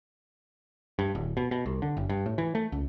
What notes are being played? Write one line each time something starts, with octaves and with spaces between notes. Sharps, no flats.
G2
D1
B2
B2
C2
D3
F#1
G2
A2
E3
A3
C#2